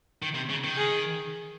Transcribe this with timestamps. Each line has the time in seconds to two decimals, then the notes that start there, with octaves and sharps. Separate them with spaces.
0.22 D#3
0.35 C3
0.50 C#3
0.64 D#3
0.77 G#4